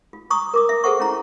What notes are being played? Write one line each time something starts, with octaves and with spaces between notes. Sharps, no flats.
F4
A#5 C#6 D#6
A#4 D6 D#6
E5
G#4 A4 C5 F#5 C#6
C#4 E4 A#5